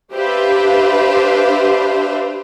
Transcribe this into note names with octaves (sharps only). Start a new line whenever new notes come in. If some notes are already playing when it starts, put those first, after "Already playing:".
D4 G4 B4 C5 E5 F5